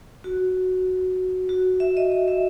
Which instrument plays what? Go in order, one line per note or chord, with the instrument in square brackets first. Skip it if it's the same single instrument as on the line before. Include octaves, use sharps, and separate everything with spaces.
[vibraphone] F#4
F#4
E5
D#5
D#5
E5